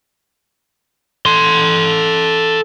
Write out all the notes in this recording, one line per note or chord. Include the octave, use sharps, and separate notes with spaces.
A4 C6